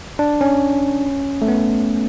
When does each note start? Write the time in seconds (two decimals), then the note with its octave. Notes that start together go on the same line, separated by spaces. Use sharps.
0.19 D4
0.41 C#4
1.42 A3
1.48 B3